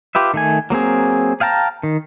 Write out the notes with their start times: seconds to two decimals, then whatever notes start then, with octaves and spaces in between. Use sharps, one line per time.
0.15 F4 G4 B4 E5
0.34 D#3 A3 G#5
0.70 F#3 A#3 C4 G#4
1.40 G#4 F5 G5 A5 A#5
1.83 D#3